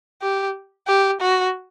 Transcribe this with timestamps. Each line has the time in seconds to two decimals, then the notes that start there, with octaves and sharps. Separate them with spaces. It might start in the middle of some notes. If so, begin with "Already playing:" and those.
0.22 G4
0.88 G4
1.21 F#4